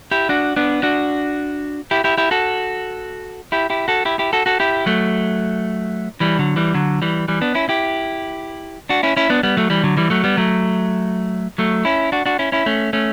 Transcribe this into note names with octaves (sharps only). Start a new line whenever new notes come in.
E4 G4
D4 F#4
B3 D4
D4 F#4
E4 G4
E4 G4
E4 G4
F#4 A4
E4 G4
E4 G4
F#4 A4
E4 G4
E4 G4
F#4 A4
F#4 A4
E4 G4
F#3 A3
E3 G3
D3 F#3
E3 G3
D3 F#3
E3 G3
E3 G3
B3 D4
C#4 E4
E4 G4
D4 F#4
C#4 E4
C#4 E4
B3 D4
G3 B3
F#3 A3
E3 G3
D3 F#3
E3 G3
F#3 A3
G3 B3
F#3 A3
F#3 A3
C#4 E4
D4 F#4
D4 F#4
C#4 E4
C#4 E4
A3 C#4
A3 C#4